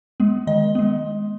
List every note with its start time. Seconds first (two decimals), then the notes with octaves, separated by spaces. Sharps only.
0.20 G#3 B3
0.47 D#3 D#5
0.75 G#3 B3